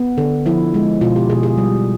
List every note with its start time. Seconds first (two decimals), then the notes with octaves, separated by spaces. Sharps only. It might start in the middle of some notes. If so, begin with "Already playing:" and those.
Already playing: B3
0.18 D3
0.46 F3 E4
0.74 G#3
1.01 B2 F4
1.16 G4
1.30 B2 G#4
1.43 G#4
1.58 G3